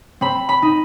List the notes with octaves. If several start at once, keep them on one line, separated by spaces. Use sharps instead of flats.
C4 B5
B5
D#4